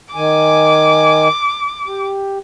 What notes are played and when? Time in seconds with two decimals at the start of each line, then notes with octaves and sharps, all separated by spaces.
0.15 D#3 G#5 D6
1.87 G4